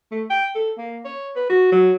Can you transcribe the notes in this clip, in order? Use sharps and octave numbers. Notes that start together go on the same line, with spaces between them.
A3
G5
A4
A#3
C#5
B4
F#4
F#3